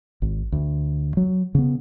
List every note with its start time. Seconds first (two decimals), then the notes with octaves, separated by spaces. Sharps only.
0.22 G#1
0.52 D2
1.17 F#3
1.55 C#3 B3